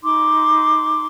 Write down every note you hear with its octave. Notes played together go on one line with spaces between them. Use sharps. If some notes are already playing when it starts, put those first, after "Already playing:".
D#4 C6 D6